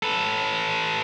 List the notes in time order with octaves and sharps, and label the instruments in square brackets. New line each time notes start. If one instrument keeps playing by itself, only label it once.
[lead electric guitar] A4 B4